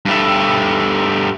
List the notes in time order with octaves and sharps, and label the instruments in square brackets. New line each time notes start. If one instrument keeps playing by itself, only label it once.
[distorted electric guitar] G2 A3